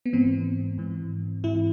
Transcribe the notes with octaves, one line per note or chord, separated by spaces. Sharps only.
B3
G#2 E3 C4
G#2 E3
G#2 E3 E4